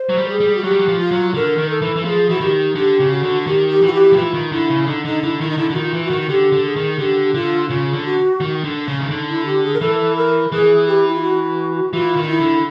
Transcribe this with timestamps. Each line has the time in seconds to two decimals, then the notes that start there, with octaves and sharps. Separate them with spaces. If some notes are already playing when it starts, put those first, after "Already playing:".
Already playing: C5
0.09 F#3
0.17 G3
0.29 G#4
0.40 G3
0.56 F#4
0.64 F#3 G4
0.71 G3
0.79 F#3
0.88 F3
0.99 F4
1.11 F#3
1.34 D3 A#4
1.58 D#3
1.70 A4
1.82 E3
1.96 E3
2.05 F3 G#4
2.29 E3 F#4
2.40 D#3 G4
2.75 D3 G4
3.00 C#3
3.11 F#4
3.23 D3
3.42 F#4
3.46 D#3 G4
3.70 G4
3.82 E3 F#4
3.93 G4
4.12 F3
4.17 E3 F4
4.34 D#3
4.52 D3 E4
4.70 C#3
4.87 D3 D#4
5.05 D3 D#4
5.23 D3 E4
5.40 D#3 E4
5.50 D#4
5.58 D3 E4
5.70 D3
5.74 D#3 F#4
5.82 F4
5.94 E3
6.05 F#4
6.10 D#3
6.22 F#4
6.28 D3 G4
6.52 D3
6.64 G#4
6.76 D#3
6.99 D3 G4
7.34 D3 F4
7.70 C#3 F4
7.93 D3
8.05 F#4
8.40 D#3
8.64 D3
8.88 C#3
9.01 D#3
9.11 D3 D#4
9.28 E4
9.46 G4
9.64 G#4
9.74 A#4
9.81 E3 A4
10.17 A#4
10.52 E3 G#4
10.87 G4
11.08 E4
11.15 F4
11.22 F#4
11.93 E3 F4
12.16 D#3
12.23 D#4
12.28 E4
12.40 D3